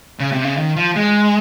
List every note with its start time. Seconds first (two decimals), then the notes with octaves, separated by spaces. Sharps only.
0.20 C#3
0.32 C3
0.44 C#3
0.57 D#3
0.76 F3
0.96 G#3